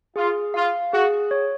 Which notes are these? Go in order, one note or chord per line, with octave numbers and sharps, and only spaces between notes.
F4 G#4
F4 F5
F#4 G#4
C#5